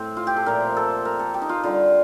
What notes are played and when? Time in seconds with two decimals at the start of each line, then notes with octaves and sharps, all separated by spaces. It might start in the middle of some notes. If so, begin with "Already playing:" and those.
Already playing: A2 A3 C4
0.17 F4
0.27 G4
0.37 A4
0.46 A#2 F3 A3 A#4
0.77 A4
1.05 A#4
1.19 A4
1.34 G4
1.42 D#4
1.49 F4
1.63 D3 G3 F4